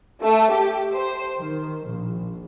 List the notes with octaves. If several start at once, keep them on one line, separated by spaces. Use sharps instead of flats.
A3
G4
C5
D#3
A#1